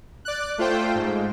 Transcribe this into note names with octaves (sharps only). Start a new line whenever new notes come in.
D5 F#6
A3 F4 C5 G5
G#2